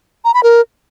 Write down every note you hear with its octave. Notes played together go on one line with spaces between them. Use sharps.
A#5
B5
A#4